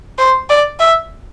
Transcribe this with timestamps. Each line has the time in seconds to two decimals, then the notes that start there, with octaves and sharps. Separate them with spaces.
0.18 C5
0.49 D5
0.79 E5